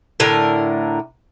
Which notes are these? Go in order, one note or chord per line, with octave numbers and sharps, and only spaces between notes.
A2 D3 A#4